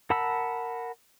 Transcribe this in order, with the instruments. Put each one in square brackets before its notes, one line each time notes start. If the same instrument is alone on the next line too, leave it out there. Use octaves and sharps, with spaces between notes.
[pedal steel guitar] A#4 F#5 A5 B5 E6